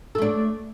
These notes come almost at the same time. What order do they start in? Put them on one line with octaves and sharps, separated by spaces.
A4 A3 D4